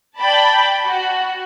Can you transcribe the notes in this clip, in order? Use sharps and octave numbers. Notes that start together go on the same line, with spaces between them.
D5 G5 A5 B5
F#4